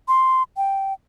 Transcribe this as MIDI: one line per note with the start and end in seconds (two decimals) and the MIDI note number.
0.08 0.43 84
0.57 0.93 79